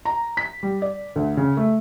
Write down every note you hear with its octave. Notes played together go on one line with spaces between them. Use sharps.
A#5
B6
G3
D5
D2
C#3
A3